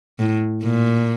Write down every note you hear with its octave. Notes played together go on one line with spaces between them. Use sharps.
A2
A#2